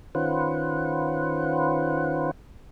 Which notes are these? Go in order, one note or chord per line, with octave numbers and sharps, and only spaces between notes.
D#3 C#4 F4 B4 C5 F#5